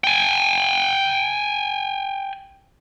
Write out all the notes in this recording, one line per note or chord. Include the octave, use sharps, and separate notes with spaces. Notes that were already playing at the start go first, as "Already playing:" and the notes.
G5 G#5